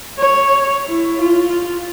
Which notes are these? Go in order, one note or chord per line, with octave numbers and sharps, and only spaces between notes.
C#5
E4
F4